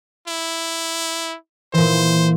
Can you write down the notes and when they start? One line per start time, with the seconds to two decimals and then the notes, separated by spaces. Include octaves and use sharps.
0.28 E4
1.73 A#2 E3 C5